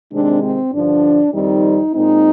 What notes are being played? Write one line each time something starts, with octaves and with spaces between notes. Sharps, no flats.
C3 D#3 G#3 C4 D4
C4
G2 D3 F3 D4
F2 D#3 G3 C4 D#4
A#2 G#3 C4 D#4